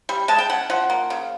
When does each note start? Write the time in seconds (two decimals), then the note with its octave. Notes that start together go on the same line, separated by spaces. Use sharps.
0.09 G3
0.28 G#3 A5
0.38 G5
0.50 C#4 F#5
0.70 F3 F#5
0.90 A#3
1.10 C#3